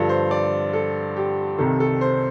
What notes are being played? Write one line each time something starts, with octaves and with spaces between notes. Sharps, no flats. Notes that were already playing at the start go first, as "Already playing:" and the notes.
Already playing: G2 D3 F3 A4
C5
D5
A4
G4
C2 C3 D#3 A4
A4
C5